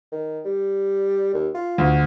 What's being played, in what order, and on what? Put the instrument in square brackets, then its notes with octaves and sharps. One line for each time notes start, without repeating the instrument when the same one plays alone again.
[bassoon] D#3
G3
D#2
F4
[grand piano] D2